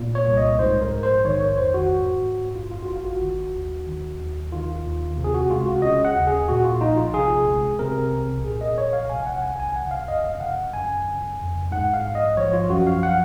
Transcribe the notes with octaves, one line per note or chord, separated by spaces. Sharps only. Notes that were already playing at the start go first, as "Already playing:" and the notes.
Already playing: A#2
C#5
C2
D#5
G#2 C5
A#4
A#1
C5
D#3 C#5
C#5
F2 C5
F#4
G#2
A#1
F#2 F4
F4
F#4
G#1 F4
F#4
D#3
D#2
D#3
D#2
D#3 F4
D#2
C3
G#4
F#4
C#2 F4
F#4
C#3 D#5
F#5
D#2
G#4
A#2 F#4
F4
A#1 D#4
F4
C3 G#4
C#2
C3 A#4
C2
A#2 G#4
D#5
A#1 C#5
F5
C3 G#5
F#5
C2 G#5
G#5
C#3 F#5
F5
F#2 D#5
F5
C#3 F#5
F#2 G#5
C#3
F2
G#2 F#5
F5
A#1
D#5
F3 C#5
F4
F#2 F#4
F5
F#5